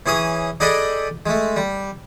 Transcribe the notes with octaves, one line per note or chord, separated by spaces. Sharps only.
E3 C#4 G#4 D#6
D4 G#4 A4 D#5 G5 B5
G#3 A3
G3